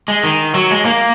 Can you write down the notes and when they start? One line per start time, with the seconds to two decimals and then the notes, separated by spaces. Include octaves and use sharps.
0.08 G#3
0.23 D#3
0.55 F#3
0.71 G#3
0.85 A#3